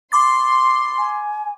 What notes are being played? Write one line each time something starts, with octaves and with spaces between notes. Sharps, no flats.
B5 C6 D6 A6
G#5